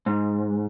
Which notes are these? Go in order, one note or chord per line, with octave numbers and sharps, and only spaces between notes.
G#2